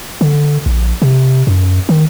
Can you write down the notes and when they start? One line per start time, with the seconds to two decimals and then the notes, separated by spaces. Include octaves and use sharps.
0.21 D3
0.66 A#1
1.02 C3
1.47 F#2
1.89 D#3